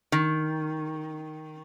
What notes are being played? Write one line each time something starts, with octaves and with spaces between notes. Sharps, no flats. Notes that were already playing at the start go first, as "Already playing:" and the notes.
D#3